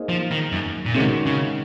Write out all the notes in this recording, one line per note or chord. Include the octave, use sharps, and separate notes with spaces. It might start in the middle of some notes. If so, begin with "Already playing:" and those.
Already playing: A#3 D#4 G#4 C5
F3
D#3
F#2
A#2
C3 D#3 G#3 C#4 F#4
C#3